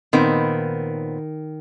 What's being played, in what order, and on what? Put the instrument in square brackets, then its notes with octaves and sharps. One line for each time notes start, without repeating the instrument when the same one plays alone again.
[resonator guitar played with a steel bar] A#2 B3 C4 [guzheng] D#3